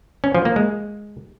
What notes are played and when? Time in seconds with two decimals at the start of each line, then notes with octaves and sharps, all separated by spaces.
0.24 C#4
0.35 F3
0.45 A#3
0.56 G#3